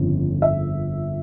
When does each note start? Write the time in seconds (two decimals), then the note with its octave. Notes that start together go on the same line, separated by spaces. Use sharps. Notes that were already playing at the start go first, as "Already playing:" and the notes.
Already playing: G1 F2 C#3
0.42 E5